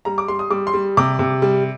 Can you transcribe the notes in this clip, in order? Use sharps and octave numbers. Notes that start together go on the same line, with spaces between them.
G3 A#5
D6
G3 C6
D#6
G3 D6
C6
G3
C3 D6
C3
G3